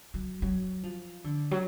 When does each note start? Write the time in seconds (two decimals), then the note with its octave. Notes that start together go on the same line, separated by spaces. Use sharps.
0.14 F#3
0.42 F#3
0.83 F3
1.24 D3
1.51 F#3